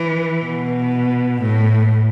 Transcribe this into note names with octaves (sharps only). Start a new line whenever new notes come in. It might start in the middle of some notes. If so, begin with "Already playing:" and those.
Already playing: E3
B2
A2